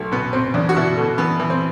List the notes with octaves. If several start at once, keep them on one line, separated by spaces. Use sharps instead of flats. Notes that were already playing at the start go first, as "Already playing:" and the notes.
Already playing: B1 A3
B2 B3
B2 C4
E2 D4
F#4
B2 E4
B2 A3
E3 B3
E3
C4